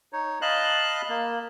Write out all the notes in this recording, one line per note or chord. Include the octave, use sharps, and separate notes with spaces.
D#4 C#5
D#5 F5 A5 B5 F#6
A#3